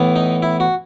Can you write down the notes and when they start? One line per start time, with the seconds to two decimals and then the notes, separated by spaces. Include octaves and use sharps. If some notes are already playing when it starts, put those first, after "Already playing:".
Already playing: A2 E3 B3
0.16 D#4
0.42 E4
0.60 F#4